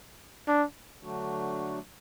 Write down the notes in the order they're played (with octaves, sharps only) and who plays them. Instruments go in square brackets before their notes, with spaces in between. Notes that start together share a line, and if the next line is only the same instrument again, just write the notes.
[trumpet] D4
[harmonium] D3 F#3 A3 D4 F#4